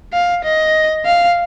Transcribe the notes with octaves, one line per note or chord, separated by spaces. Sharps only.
F5
D#5
F5